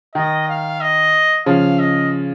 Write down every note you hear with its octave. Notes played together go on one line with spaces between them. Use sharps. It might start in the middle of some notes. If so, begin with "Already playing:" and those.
D#3 D#5
F5
D#5
C#3 F3 F5
D#5